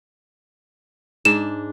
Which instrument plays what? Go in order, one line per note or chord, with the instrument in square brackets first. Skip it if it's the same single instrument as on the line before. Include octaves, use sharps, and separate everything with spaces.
[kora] G#2 D4 [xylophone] E7